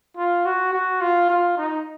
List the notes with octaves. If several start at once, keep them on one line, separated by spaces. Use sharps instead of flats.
F4
F#4
F#4
F4
F4
D#4